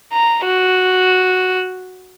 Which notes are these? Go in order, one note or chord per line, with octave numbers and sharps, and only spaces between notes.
A#5
F#4